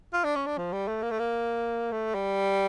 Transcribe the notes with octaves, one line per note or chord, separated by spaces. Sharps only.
F4
D4
C#4
D4
F3
G3
A3
A#3
A3
A#3
A3
G3